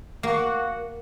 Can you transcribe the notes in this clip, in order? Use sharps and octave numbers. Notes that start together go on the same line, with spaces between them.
A#3 F#4